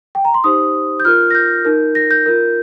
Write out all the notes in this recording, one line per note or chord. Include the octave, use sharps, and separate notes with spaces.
G5
A#5
C6
D#4 G4 C5 D#6
G6
F4 A#4 F6
A#6
G6
D#4 A#4
A#6
G6
F4 A#4